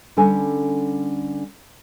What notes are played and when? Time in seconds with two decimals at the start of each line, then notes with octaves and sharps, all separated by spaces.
0.17 D3 G3 C#4 A4 G#5